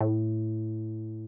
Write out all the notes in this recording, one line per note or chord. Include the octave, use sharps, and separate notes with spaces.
A2